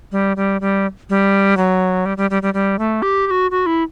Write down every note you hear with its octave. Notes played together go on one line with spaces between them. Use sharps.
G3
G3
G3
G3
F#3
G3
G3
G3
G3
G3
A3
G4
G4
F#4
F#4
E4